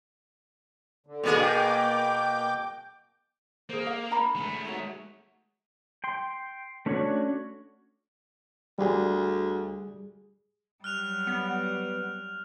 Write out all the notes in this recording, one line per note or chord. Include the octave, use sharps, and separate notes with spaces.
D3
B2 A#3 G#4
G5 D6 G6
A#3 G#4 C5
F5
D4 A#5 B5
G#3 A3
D#4 F#4 C#5
G5 C6
A3 C#4 D4 F#4 C#5
D2 G3 G#4
F#3 G3 F6 F#6 F7
B3